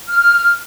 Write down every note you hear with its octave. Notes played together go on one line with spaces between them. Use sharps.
F6